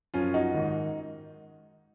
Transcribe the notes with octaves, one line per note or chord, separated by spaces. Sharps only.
F#2 F3 C#4 F4
D#4 F#4
G#2 D#3